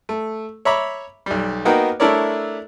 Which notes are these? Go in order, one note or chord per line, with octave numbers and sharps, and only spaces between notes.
A3
C#5 E5 A#5 B5 D6
B1 G3
A#3 B3 D#4 F#4 A#4 G5
A3 D4 E4 A#4 C#5 D5